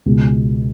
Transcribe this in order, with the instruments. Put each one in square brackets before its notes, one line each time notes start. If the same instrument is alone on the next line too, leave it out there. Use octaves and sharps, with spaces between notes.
[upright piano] C#2 B2 G#3